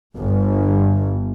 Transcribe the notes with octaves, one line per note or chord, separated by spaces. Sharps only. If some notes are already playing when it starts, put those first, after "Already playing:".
G1